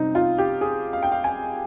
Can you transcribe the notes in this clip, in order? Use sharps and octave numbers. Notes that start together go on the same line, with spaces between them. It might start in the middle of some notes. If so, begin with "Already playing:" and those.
Already playing: C3 G3 C4 D#4
F4
G4
G#4
F5
G5
F5
G#5